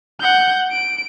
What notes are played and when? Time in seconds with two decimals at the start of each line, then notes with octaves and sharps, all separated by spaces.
0.20 F#5 G6
0.71 D7